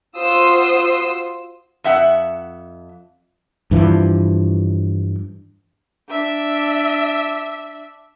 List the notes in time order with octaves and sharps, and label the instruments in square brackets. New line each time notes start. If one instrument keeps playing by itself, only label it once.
[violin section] F4 F#4 C5 C6 D#6 E6
[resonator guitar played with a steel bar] F2 E5 F#5
[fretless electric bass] G2 E3 F3
[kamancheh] D4 E5